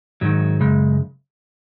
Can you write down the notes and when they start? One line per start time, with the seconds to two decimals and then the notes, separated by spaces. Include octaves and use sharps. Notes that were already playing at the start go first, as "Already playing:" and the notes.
0.21 G#2 D#3 F#3
0.61 F#2 C#3 G#3